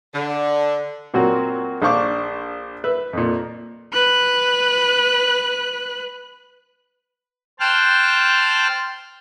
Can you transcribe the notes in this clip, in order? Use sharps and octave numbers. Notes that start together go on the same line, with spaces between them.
D3
A#2 F#3 A#3 C4 F#4
A#1 D4 C5 F5 C#6 D6
B4 E5
F2 A#2
B4 F#6
C5 G5 A5 F6 F#6